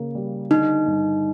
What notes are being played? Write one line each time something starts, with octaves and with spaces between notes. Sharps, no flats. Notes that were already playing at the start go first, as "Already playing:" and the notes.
Already playing: C#3 A#3
G3
D3 D#4
G2